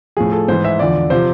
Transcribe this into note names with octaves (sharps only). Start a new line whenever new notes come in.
A2 F3 G#4
A4
G#2 E3 C5
E5
E2 D3 F3 D5
C3 F3 C5